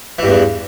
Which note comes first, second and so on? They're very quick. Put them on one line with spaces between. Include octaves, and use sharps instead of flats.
E3 G2 E2